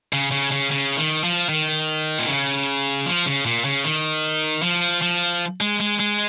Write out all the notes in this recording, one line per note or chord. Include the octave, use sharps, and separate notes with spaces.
C#3
C#3
C#3
C#3
D#3
F3
D#3
A#2
C#3
F3
C#3
A#2
C#3
D#3
F3
F3
G#3
G#3
G#3